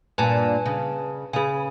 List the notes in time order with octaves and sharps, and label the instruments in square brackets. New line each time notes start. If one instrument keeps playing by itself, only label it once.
[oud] G2 A#2 [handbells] B4 G#5 A5
[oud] C#3
[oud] C#3 B4 [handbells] G#4 G#5